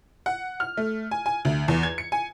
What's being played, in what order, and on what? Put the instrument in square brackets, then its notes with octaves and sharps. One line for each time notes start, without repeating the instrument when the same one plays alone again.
[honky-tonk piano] F#5
F6
A3
G#5
G#5
D2
E2
G#6
C#7
G#5